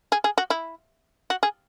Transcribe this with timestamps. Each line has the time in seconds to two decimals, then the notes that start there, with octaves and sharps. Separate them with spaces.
0.12 G#4
0.24 G#4
0.38 F#4
0.50 E4
1.30 F#4
1.43 G#4